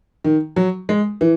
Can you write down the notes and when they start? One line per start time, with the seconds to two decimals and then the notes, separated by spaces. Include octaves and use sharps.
0.24 D#3
0.56 F#3
0.89 G#3
1.21 E3